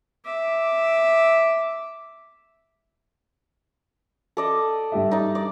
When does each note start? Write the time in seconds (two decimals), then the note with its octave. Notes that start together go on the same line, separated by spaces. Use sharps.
0.25 E5 D6
4.37 A4 D5 D#5
4.92 G2 G4 E5
5.11 D#4 D5
5.35 D5